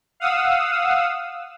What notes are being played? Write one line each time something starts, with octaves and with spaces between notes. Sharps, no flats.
F5 F#5 D#6 E6